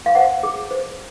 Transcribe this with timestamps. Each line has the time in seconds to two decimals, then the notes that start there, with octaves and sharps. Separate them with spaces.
0.06 F5
0.15 C5 F#5
0.43 G#4
0.71 C5